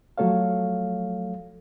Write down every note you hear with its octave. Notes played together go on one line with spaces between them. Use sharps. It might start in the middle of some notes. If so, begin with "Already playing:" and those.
F3 F#3 A3 A4 C#5 F5